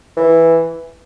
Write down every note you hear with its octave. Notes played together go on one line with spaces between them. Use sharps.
E3